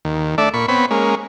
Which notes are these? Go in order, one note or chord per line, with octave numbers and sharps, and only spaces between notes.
D#2
A3 D4 D5 E5
A#2 B5 C#6
B3 C4 C#5 B5
G#3 A#3 C#4